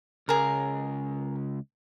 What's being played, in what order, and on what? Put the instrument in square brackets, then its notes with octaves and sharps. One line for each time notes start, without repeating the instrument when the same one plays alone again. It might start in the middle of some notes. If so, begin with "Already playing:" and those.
[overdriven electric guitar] C#2 [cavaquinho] G#4 A#4